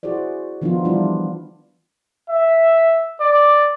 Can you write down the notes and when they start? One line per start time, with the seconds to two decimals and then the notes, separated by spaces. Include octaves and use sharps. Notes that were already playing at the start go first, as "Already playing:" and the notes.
0.03 E4 F#4 G#4 C5 D5
0.62 D#3 F3 B3 D4 D#4 F4
0.85 E3 G3 D4 E4 F4
2.29 E5
3.20 D5